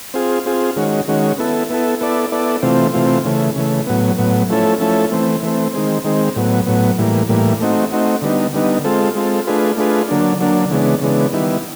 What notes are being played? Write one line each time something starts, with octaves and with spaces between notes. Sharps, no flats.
C4 F4 G#4
C4 F4 G#4
D#3 G#3 C#4 F#4
D#3 G#3 C#4 F#4
B3 E4 A4
B3 E4 A4
B3 E4 A4 D5
B3 E4 A4 D5
C3 E3 A3 C4 F4
C3 E3 A3 C4 F4
C#3 E3 A3
C#3 E3 A3
A2 F#3 B3
A2 F#3 B3
F3 A3 C#4 E4 A4
F3 A3 C#4 E4 A4
E3 A3 C4
E3 A3 C4
D#3 G#3 C4
D#3 G#3 C4
A2 F#3 B3
A2 F#3 B3
A2 E3 G3 A#3
A2 E3 G3 A#3
A3 C4 D#4 F#4
A3 C4 D#4 F#4
D3 G3 B3 D#4
D3 G3 B3 D#4
G#3 C4 F4 A4
G#3 C4 F4 A4
A3 D4 F4 G#4 B4
A3 D4 F4 G#4 B4
D3 F#3 A#3 D4
D3 F#3 A#3 D4
C#3 E3 G#3 B3 D4
C#3 E3 G#3 B3 D4
D#3 G3 B3 E4